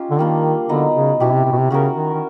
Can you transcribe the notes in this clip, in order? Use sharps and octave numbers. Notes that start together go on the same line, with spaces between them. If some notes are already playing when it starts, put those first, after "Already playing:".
Already playing: C#4 D#4 F4 G4
D3
D#3 G3 A#3 D4
D3 F#3 B3 D#4
C#3
B2 C#4 E4 G4
C3
C3
B2
C3
C#3 C#4 F#4 A#4
D#3
D#3